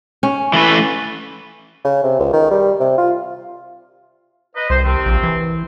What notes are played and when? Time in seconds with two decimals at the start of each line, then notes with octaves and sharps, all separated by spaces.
0.23 C#4
0.53 E3 A3 B4
1.84 C#3
2.03 C3
2.19 C#2
2.33 D#3
2.51 G3
2.80 C3
2.98 F4
4.55 B4 D#5
4.70 C2 C5
4.84 C3 D#3 C4
5.06 A#1
5.23 E3